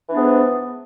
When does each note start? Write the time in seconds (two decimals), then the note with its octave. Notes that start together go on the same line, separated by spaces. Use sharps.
0.07 E3
0.10 D4
0.14 B3
0.17 G#2